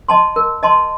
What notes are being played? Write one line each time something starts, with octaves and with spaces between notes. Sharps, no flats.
D#5 A5 C6
A#4
D#5 A5 C6